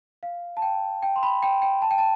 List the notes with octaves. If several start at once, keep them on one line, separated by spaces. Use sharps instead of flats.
F5
A5
G5
G5
C6
B5
G5
G5
A5
G5
A5